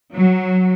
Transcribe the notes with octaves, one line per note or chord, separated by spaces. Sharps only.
F#3